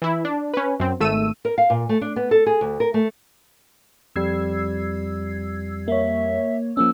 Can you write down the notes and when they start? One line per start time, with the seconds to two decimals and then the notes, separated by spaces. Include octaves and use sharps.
0.02 E3 E4
0.25 D4
0.54 C#4 B4
0.80 F#2 C4
1.00 G#1 A3 E6 D#7
1.45 A#4
1.58 F5
1.70 A#2
1.89 A3
2.01 D4
2.16 B3
2.31 A4
2.46 G#4
2.61 D2
2.80 A#4
2.94 A3
4.16 F2 G3 E6 G#6 C7
5.88 A#3 C#5 E5
6.77 F3 A#3 C#4 E6